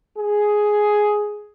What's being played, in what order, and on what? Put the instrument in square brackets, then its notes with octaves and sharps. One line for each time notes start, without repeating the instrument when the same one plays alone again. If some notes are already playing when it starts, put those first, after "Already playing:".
[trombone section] G#4